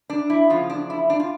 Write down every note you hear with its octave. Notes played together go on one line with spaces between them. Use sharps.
D4
E4
E2 C#3 F3 F4
D4
E4
D4
F4